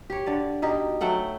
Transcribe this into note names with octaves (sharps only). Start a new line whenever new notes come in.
G4 C#5
D3 D5
B2 D#4 G4
F#3 A3 F#5 G5